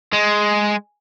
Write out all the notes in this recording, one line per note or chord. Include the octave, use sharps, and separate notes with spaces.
G#3